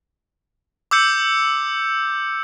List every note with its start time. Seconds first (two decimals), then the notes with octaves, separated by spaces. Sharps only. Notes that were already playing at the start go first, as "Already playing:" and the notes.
0.91 D6 E6 G6 C#7